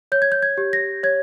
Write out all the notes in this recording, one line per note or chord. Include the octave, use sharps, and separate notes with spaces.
C#5 G6
G#6
G6
G#6
G4
A#6
C#5 G#6